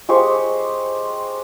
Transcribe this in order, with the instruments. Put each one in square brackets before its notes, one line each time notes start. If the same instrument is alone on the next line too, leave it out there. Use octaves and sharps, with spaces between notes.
[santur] G#3 G4 C5 C#6